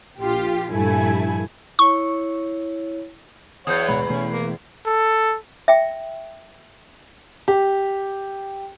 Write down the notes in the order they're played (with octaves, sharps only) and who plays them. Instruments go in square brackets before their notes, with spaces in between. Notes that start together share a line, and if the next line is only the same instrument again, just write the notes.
[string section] A#1 F4 G4
A#1 G2 F3 A3 E4 G#5
[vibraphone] E4 C#5 [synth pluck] C#6
[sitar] E2 [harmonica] C#5 F#5 [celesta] D#6 G6
[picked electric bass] D1 B2 G#3 [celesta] B5
[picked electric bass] B2 E3 A3 [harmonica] C#4
[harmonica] A#3
[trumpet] A4
[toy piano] E5 G5
[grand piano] G4